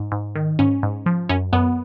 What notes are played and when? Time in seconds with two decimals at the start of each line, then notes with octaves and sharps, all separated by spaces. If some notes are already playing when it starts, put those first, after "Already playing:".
Already playing: G#2
0.12 G#2
0.36 D#3
0.59 G#2 C#4
0.83 G#2
1.06 F3
1.29 F#2 C#4
1.53 F#2 B3